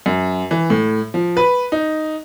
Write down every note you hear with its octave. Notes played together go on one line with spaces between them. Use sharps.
F#2
E3
A2
F3
B4
D#4